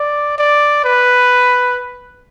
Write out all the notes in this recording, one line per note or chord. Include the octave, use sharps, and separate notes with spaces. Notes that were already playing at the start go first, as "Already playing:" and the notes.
Already playing: D5
D5
B4